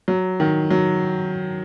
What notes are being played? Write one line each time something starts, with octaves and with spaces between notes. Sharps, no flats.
F#3
D#3
F#3